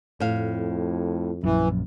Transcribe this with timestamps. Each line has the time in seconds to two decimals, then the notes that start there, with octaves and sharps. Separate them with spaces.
0.20 F2 A2 F5
1.44 A#1 F#2 E3